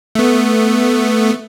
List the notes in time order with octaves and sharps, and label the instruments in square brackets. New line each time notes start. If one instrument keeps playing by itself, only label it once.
[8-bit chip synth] A3 B3